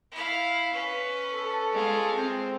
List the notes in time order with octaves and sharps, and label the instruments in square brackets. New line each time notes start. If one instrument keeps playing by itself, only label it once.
[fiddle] E4 F5
[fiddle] C#4 [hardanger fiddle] B4
[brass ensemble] A4
[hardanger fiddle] G#3 F4
[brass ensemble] C4